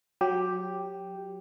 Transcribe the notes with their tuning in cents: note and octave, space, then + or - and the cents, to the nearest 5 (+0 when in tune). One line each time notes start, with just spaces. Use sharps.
F#3 -15 G4 +0